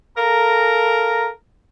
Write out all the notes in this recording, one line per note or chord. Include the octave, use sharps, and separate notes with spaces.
A4 A#4 F5 A#5